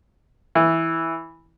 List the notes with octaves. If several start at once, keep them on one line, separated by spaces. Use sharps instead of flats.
E3